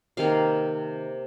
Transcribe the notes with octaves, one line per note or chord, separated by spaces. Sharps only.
C3 D#3 A#3 F5